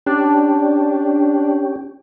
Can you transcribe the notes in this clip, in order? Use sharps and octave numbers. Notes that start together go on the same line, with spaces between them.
C#4 D4 G4